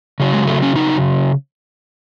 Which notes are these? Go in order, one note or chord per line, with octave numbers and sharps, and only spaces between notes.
C#3 F#3
G#3
A3
C#4
D#4